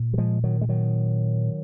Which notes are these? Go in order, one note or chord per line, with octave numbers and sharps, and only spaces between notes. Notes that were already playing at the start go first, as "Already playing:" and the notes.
Already playing: A#2
F#3
F3 G#3
D#3 F#3
G#3
D#3 F#3